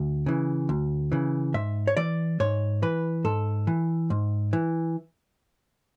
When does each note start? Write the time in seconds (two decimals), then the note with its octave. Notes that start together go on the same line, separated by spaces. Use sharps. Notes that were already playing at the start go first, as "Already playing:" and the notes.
Already playing: D2
0.26 C#3 E3
0.69 D2
1.12 C#3 E3
1.54 G#2 E5
1.87 C#5
1.97 E3 D5
2.40 G#2 C#5
2.83 E3 B4
3.24 G#2 A4
3.67 E3
4.10 G#2
4.53 E3